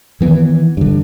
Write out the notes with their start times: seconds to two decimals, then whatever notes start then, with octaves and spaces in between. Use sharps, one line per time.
0.21 D#3 E3 B3
0.77 G2 D3